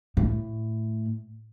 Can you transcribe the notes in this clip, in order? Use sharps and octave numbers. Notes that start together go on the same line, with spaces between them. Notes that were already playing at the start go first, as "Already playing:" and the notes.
A2